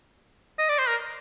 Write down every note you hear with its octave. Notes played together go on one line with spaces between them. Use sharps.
D#5
D5
C5
A#4